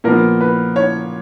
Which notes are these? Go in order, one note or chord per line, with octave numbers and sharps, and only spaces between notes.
A#2 F3 B3 A#4
B4
C#5